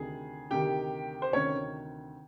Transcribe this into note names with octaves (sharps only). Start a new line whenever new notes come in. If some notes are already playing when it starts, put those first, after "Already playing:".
Already playing: D2 C3 D#3 G#4
D2 C3 D#3 G4 G5
C5
D2 C3 D#3 C#4 C#5